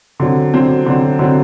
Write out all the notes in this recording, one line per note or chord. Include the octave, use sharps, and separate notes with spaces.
D3 F#3 C4
D3 F#3 C4
D3 F#3 C4
D3 F#3 C4